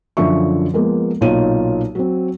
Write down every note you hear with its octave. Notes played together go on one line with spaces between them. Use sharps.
F#2 D3 F3 E5 C#6
F3 G#3 A#3 B3
B1 A#2 D#4 F4 C#5 D#7
F#3 C4